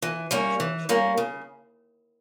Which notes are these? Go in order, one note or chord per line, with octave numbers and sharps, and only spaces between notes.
E3
G3 A#3 C#4
E3
G3 A#3 C#4
C#3